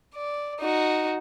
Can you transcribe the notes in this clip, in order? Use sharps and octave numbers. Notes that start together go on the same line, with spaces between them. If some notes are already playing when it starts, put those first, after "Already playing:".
D5
D#4 F#4